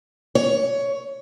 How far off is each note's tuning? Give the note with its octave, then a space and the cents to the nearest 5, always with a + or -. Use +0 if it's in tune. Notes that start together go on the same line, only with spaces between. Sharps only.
C#5 +15